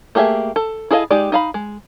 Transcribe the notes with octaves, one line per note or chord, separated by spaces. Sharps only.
A3 A#3 G4 G#4 E5
A4
E4 G#4 A4 D#5 F5
G#3 D#4 G4 D5
D#4 F5 B5
G#3